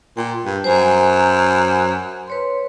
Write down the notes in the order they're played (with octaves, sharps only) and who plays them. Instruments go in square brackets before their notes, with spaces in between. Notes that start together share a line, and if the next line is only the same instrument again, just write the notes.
[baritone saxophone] A#2 [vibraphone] G5
[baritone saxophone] G2
[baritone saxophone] F#2 [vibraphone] C5 G#5 A#5
[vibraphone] B4 C#5 C6